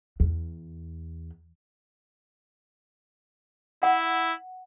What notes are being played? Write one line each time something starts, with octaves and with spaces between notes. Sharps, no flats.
E2
E4 F#5